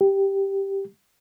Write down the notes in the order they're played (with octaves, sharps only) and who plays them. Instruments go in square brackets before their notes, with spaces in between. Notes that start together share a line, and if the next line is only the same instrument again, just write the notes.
[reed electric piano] G4